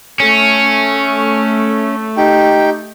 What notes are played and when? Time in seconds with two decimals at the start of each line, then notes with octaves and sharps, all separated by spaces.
0.20 A3 C#4
2.17 D#4 G4 G5